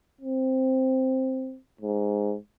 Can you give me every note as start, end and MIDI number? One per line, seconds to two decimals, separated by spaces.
0.21 1.57 60
1.81 2.35 44